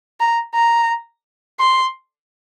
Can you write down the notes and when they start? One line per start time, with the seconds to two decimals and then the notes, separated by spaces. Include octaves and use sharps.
0.20 A#5
0.55 A#5
1.60 C6